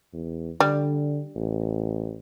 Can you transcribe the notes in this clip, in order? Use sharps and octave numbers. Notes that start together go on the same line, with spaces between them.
E2
D3 G3
A1